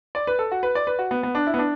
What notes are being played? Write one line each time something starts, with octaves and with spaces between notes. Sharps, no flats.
D5
B4
A4
F#4
B4
D5
B4
F#4
B3
B3
D4
E4
B3
D4